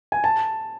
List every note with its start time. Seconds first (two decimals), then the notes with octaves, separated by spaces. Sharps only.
0.12 G#5
0.24 A5